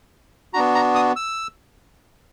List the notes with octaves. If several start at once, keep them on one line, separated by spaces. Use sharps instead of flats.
B3 D4 F#4 A#5
A#5
D#6
E6